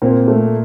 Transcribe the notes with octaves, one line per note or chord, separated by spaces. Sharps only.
A#2 A#3 C4
A3